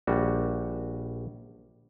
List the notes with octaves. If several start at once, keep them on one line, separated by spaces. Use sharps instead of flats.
A#1 G3 F#4